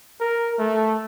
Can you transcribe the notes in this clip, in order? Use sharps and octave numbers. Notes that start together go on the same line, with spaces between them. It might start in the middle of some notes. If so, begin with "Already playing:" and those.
A#4
A3